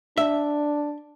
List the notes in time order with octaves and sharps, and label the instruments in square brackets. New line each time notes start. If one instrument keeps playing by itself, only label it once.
[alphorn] D4 [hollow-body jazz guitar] E5